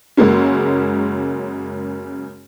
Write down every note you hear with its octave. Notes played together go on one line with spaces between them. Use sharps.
F#2 C#3 G#3 A#3 C#4